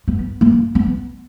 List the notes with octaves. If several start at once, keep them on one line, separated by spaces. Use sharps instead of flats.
B3
A#3
B3